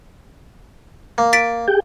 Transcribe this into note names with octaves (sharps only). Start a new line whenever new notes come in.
A#3
A6 B6 D7
G4 G#4 G5